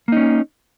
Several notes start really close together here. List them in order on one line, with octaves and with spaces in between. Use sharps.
A#3 D#4 C#4